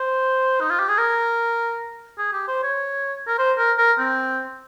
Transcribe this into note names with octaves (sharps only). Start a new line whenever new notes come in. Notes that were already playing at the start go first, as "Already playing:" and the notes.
Already playing: C5
D#4
F4
G4
G#4
A#4
G#4
G4
C5
C#5
A#4
C5
A#4
A#4
C4